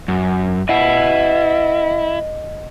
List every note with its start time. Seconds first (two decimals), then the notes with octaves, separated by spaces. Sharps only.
0.08 F#2
0.69 E4 D#5 F#5